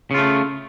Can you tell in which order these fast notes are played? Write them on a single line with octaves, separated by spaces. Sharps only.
C#3 F4 A3